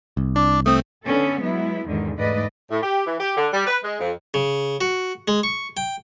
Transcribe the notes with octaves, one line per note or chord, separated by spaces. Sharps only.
C2
D4 D6
A3 C4 D#6
D3 B3 C#4 A4
F#3 G#3 B3 E4
E2 G#2 D3 D#3
G#2 A3 B4 D5 D#5
A2
G4
E3
G4
D3
G3
B4
G#3
F2
C#3
F#4
G#3
C#6
G5